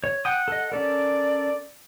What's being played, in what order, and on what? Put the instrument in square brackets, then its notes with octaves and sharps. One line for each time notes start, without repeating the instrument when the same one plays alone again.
[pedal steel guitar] C#5
[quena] F#5 [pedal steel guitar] G5 D#6
[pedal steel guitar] A4 D#5
[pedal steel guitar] C#4 A4 A#4 [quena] D5